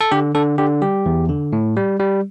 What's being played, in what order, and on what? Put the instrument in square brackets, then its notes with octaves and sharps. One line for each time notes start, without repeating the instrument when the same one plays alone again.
[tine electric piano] A4
D3 G4
D3 A4
D3 G4
G3 G4
E2
D3
A2
G3
G3